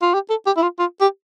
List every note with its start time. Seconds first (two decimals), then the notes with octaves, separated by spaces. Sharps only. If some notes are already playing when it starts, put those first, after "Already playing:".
0.02 F4
0.14 G4
0.30 A4
0.46 G4
0.56 E4
0.62 F4
0.79 F4
1.00 G4